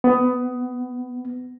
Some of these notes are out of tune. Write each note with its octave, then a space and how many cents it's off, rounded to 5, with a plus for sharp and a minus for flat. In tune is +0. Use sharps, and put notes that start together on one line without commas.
B3 +20